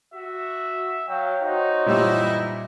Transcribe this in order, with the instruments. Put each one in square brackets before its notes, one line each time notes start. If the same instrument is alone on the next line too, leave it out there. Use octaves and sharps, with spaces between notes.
[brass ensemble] F#4 [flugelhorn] E5
[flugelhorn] F#3 [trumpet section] C#5 F5 G5
[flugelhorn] D#4 [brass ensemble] F#4 [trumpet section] C5 C#5 F#5
[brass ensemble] F#2 E3 E4 [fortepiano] A#2 G3 E6